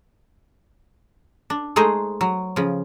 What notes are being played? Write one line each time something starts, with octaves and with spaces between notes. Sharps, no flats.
D4
G#3 A3 D#4 G#4 C5 D#5
F#3
C#3 F3